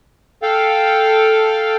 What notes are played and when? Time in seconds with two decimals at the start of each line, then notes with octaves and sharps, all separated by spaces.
0.43 A4 F5 G5